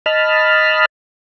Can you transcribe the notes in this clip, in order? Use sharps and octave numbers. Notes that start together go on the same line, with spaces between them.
D#5 A5 B5 F6